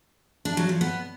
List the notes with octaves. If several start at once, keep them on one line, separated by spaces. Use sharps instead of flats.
D4
F#3
F3
B3